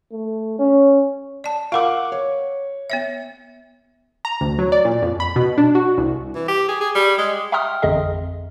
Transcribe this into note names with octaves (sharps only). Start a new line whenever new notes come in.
A3
C#4
D5 A5
F4 A#4 F5 F#5 D6
C#5
B3 C#5 E5
A#5
D2
F#3
D5
A#2
F2
B5
B2
D4
F#4
C2
E3
G4
G#4
G#4
G3
G#3
E5 G5 A#5 C6 D#6 F6
A1 F2 D3 G#4 D#5 E5